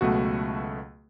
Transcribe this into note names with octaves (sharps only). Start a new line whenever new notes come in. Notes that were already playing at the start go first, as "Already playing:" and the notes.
C#2 B2 F#3 A3 F#4